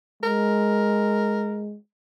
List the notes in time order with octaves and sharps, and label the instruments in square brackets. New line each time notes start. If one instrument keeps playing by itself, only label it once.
[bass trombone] G#3 [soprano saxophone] A#4